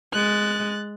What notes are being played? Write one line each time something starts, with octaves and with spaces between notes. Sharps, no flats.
G#3 F#6 A6